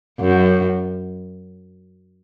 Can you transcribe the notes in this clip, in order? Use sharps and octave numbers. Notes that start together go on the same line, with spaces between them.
F#2